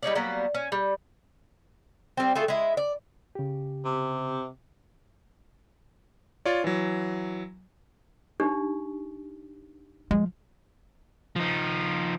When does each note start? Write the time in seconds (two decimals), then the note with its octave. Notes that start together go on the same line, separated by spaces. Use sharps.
0.03 G3 D#4 C#5 D5
0.15 F#3 G3 A#3 B3
0.54 C#4
0.72 G3
2.17 G3 C4
2.35 A3 F4 G#4 A4
2.48 G#3 E4
2.77 D5
3.35 C#3 G4
3.85 C3
6.45 F4 C#5 D5
6.64 E3 F#3
8.40 D4 D#4 G4
10.11 F3 G#3
11.36 F3 D#4